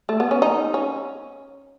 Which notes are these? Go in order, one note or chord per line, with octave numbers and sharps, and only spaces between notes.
A3
B3
C#4
D#4
C#4